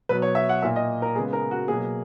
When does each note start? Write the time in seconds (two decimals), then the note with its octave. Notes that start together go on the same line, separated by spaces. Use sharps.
0.09 B2 F#3 B3 B4
0.22 C#5
0.35 E5
0.49 F#5
0.62 A#2 A#3 E5
0.76 D#5
1.02 A#4
1.15 C#3 G#3 B3 G#4
1.33 A#4
1.51 F#4
1.68 B2 F#3 A#3 G#4